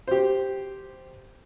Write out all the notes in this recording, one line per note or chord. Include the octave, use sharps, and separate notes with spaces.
G4 C5